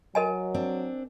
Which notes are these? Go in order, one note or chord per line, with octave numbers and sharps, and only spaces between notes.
F#3 A#4 D#5 G#5
C4 D4